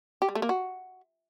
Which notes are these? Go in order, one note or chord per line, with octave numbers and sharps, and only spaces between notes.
G4
G3
A3
A#3
F#4